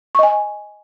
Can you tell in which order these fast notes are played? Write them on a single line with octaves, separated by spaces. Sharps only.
C#6 D#5 G#5